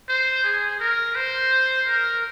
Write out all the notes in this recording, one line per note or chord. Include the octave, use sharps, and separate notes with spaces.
C5
G#4
A#4
C5
A#4